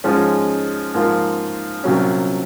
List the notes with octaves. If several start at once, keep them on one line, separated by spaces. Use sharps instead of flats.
G#2 F3 G#3 C#4
G#2 F3 A#3 F4
C2 A#2 F#3 C#4